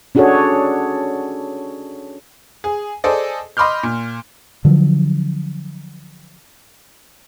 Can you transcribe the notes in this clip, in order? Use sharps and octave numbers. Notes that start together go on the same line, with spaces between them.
C#4 D4 F#4 G#4 A4 C#5
G#4
G#4 A4 C5 D5 D#5
D#5 B5 C6 D6 F6 G6
A#2
D3 F3 F#3